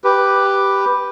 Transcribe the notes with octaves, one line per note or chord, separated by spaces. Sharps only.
G4 B4